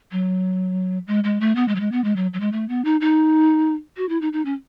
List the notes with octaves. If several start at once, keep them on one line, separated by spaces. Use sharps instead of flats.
F#3
G#3
G#3
A3
B3
G#3
F#3
G#3
B3
G#3
F#3
F#3
G#3
A3
B3
D#4
D#4
F#4
E4
D#4
D#4
C#4